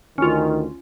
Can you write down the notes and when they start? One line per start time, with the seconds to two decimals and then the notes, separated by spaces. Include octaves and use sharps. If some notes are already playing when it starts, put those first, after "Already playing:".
0.18 D2 D#3 C#4 F4